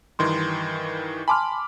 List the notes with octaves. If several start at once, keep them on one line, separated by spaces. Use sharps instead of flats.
G2 D#3 E3 C6
G#5 A5 B5 C6 D6 F6